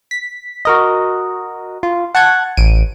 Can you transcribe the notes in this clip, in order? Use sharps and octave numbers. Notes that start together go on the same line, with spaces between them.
B6
F#4 A#4 D#5
F4
F#5 A5 C#6 F#6 G#6
A1 D7 D#7